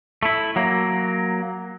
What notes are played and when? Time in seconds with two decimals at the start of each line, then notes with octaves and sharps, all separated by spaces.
0.23 A3 E4
0.56 F#3 A#3